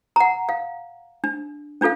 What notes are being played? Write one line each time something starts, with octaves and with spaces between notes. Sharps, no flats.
F#5 A#5
F5
D4
C#4 D4 F4 A4 F5